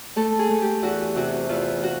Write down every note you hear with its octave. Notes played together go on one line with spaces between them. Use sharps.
A3 A4
G#4
A3
G4
E2 F#4
C3 F#4
E2 F4
F#4